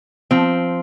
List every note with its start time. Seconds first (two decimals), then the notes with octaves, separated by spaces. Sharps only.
0.31 F3 C4